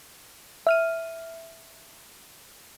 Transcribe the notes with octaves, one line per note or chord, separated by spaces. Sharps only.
E5 F6 D#7